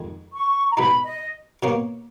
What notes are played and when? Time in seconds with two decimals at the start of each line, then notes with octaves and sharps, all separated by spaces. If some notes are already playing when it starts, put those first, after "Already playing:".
Already playing: F2 D#3 G#3
0.33 C#6
0.71 A#5
0.76 B2 G#3 D#4 B5
1.05 D#5
1.63 B2 A#3 C#4